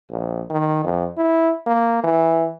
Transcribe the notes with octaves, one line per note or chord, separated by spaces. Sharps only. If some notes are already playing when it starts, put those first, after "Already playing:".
A#1
D#3
F2
E4
A#3
E3